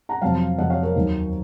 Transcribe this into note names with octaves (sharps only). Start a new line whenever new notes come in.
F#5 A#5
F2 C3 F#3 F5 A5
F2 C3 F#3 D#5 F#5
C#5 F5
A#4 C#5
D#2 D#3 F#3